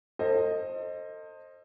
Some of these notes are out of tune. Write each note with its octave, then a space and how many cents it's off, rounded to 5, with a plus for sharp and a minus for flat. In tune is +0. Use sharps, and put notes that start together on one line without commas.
A4 +40 C5 +20 D#5 +0